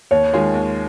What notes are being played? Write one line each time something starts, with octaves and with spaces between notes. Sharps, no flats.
D#2 C#5
D#3 G#3 F4 G#4
D#2